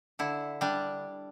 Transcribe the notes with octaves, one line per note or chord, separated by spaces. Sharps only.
D3 E4
G3 D4